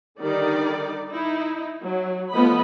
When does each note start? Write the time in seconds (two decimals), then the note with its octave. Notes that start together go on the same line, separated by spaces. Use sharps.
0.20 D3 D#3 G3 D#4 D5
1.10 D#4 E4
1.81 F#3
2.30 F3 A3 B3 B4 D#5 B5